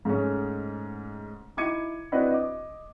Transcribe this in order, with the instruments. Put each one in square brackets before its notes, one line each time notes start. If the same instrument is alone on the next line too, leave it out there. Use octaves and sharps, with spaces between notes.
[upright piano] G#2 G#3 A3 C#4
D#4 E4 D6 G#6 C#7 D#7
C4 D4 E4 F#4 B4 D#5
D#5 D6